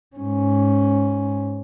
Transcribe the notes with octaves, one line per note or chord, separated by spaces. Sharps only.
G#2 C#4